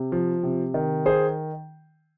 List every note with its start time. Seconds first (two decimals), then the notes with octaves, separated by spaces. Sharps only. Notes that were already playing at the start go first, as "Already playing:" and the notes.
Already playing: C3
0.12 F3
0.43 C3
0.74 D#3
1.06 G#4 C5